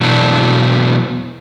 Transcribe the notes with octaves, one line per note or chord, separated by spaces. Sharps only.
B2 E3 F#3 B3 D4 F#4